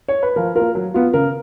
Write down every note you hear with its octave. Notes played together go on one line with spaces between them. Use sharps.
C#5
B4
F3 A#4
A#3 F4 A#4
F#3
B3 F4
C#3 A#4